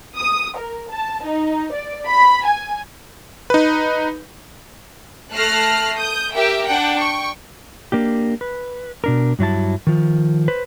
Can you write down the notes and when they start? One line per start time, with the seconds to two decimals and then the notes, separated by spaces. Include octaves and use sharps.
0.17 D#6
0.58 A#4
0.90 A5
1.25 D#4
1.73 D5
2.08 B5
2.46 G#5
3.50 D#4 B4
5.33 A3 A5 F6 F#6 A#6 C7
5.97 D#6 G6
6.34 G4 A#4 E5 G5
6.66 D4 F#5 G5
6.98 G5 C#6
7.92 A#3 D4 G4
8.41 B4
9.04 B2 D4 A#4
9.39 G2 F#3 E4 A5
9.87 D#3 F3
10.48 B4 C5